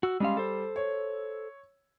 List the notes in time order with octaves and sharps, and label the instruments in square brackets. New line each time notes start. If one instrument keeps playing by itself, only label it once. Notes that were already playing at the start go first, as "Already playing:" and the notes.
[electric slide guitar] F#4 [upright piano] E6
[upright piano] G3 C6 [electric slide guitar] G#3 C#4 F5
[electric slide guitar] A4 C5
[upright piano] C#5